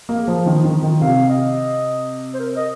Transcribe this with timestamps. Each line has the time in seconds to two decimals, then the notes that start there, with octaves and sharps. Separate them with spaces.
0.09 A#3
0.17 G#4
0.28 F3
0.45 D#3 F4
0.64 D#3
0.83 D#3
1.01 C3 F5
1.29 D#5
2.34 C5
2.40 A#4
2.56 D#5